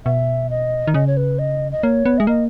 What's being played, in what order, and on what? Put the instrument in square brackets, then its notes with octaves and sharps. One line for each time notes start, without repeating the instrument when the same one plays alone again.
[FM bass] B2 [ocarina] E5
[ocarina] D#5
[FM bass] D#3
[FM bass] C#3 [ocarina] D#5
[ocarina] C#5
B4
D#5
D#5
[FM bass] A#3 [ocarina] C#5
[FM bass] B3
[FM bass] G#3 [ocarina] E5
[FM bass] A#3 [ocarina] D#5